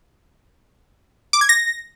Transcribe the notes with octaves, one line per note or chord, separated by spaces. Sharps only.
D6
G#6
A#6